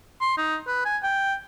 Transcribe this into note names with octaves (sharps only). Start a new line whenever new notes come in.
C6
D#4
B4
G#5
G5